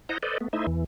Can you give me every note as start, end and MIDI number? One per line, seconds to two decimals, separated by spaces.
0.09 0.18 64
0.09 0.18 72
0.09 0.18 75
0.09 0.18 78
0.09 0.18 82
0.23 0.38 69
0.23 0.38 71
0.23 0.38 72
0.23 0.38 74
0.23 0.38 75
0.41 0.48 57
0.41 0.48 59
0.53 0.66 57
0.53 0.66 63
0.53 0.66 64
0.53 0.66 72
0.53 0.66 75
0.53 0.66 76
0.67 0.84 40
0.67 0.84 52